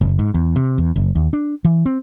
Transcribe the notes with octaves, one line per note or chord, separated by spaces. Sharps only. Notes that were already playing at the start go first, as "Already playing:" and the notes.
F#1
G#2
E2
C3
E2
F#1
D#2
D4
E3
C4